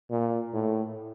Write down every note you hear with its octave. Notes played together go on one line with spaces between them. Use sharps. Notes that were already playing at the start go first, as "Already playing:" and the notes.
A#2
A2